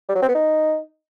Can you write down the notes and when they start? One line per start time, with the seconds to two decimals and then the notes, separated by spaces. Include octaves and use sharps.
0.09 G3
0.15 F#3
0.22 C4
0.28 B3
0.35 D#4